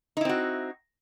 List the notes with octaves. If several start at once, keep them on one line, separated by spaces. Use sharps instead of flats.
C4 D#4 E4 F#4